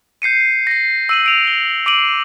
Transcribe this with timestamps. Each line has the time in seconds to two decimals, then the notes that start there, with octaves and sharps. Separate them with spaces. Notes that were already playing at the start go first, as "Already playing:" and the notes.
0.22 G6 C7 C#7 D#7
0.67 A#6 C7
1.09 E6 D#7 F#7
1.26 D7 F7
1.47 G7
1.86 D6 C7 D7 D#7 F#7